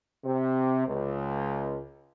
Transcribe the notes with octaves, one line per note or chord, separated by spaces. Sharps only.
C3
C#2